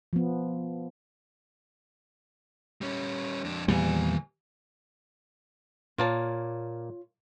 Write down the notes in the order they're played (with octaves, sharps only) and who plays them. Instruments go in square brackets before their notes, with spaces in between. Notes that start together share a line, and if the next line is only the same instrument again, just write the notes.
[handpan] F3 B3
[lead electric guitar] G3 C#4
F2 D4
[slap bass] E2 A#2 G3 [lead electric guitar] D#3 G#5
[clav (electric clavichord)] A#2 A#3 A5 [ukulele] F4 C#5